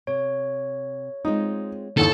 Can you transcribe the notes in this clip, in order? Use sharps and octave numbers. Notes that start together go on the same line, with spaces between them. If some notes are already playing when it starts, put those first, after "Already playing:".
C3 C#5
G#3 C4 D#4 F4
D#2 D3 E3 A4